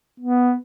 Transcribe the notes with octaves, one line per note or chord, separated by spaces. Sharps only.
B3